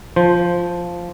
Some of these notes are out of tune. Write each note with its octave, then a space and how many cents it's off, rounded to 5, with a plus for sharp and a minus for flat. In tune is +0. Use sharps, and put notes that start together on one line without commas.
F3 +0 C5 +0